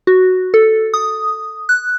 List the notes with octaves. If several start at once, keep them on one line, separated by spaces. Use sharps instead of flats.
F#4
A4
D#6
F#6